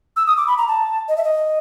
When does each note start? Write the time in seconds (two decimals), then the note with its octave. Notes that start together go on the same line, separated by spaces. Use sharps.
0.17 E6
0.27 D#6
0.37 D6
0.47 B5
0.58 A#5
0.68 A5
1.08 D#5
1.17 E5
1.24 D#5